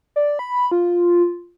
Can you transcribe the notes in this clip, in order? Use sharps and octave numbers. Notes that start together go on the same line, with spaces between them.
D5
B5
F4